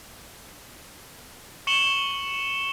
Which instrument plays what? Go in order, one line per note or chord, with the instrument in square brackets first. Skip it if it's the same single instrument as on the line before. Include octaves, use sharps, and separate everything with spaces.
[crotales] C#6 C#7 E7 F#7 G7